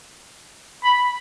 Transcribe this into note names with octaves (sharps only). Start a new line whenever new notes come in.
B5